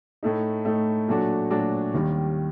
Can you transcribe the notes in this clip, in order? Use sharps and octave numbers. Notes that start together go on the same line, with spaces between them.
A2 A3 D#4
A2 A3 D#4
A#2 F#3 A3 D4 F#4
A#2 F#3 A3 D4 F#4
D#2 D#3 G3